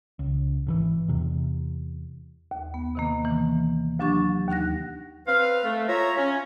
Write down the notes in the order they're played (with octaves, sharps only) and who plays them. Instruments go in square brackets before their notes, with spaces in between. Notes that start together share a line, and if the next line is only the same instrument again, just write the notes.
[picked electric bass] C#2
G#1 D3 E3
E2 C3
[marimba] D#2
B3
C3 D#3 A#3
E3
D2 F#3 D4 G4 C#6 A6
D#2 D#4 F#5 F#6 A#6
[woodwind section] C4 B4 F5
A3
F4 C#5 E5 A#5
C#4